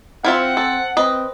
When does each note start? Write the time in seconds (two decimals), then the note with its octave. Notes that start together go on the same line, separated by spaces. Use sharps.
0.24 C4 E4 F4 E5 F#5
0.57 A4
0.97 C4 B4 D#5